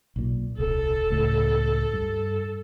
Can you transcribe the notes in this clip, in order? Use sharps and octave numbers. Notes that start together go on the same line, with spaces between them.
B1 A#2
D#1 C2 A4
C#2 A2
G2